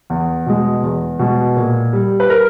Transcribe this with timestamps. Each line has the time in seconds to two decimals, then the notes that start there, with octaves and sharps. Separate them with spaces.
0.10 E2
0.46 B2 G#3
0.83 E2
1.19 B2 G#3
1.57 A#2
1.93 G3
2.20 B4
2.30 A#4